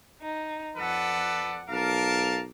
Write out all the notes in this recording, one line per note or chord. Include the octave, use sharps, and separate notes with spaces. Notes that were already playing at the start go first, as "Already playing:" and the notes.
D#4
F2 A4 B4 D5 F#5
B1 A#4 F5 A5 D6